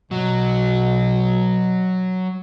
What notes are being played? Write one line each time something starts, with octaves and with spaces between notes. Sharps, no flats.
B2 F#3